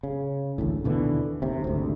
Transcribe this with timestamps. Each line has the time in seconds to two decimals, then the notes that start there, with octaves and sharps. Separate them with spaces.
0.03 C#3
0.58 A1 D2 A2
0.84 D#2 B2 D3 E3
1.42 D#2 C3
1.64 G#1 D2